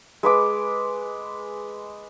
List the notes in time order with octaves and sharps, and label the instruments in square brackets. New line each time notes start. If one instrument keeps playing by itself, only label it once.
[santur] G#3 B4 B5 D6